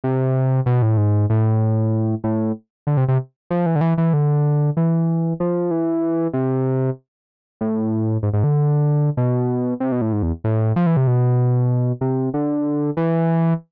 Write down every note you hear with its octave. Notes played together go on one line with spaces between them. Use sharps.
C3
B2
A2
G#2
A2
A2
D3
C3
C3
F3
E3
D3
E3
E3
D3
E3
F3
E3
C3
A2
G#2
G#2
D3
B2
C3
B2
A2
G#2
E2
A2
F3
E3
C3
B2
C3
D3
E3